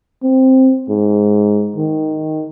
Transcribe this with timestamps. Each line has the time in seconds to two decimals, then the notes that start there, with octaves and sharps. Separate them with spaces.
0.23 C4
0.89 G#2
1.76 D#3